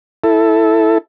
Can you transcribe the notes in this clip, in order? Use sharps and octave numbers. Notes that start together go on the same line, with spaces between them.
E4 A4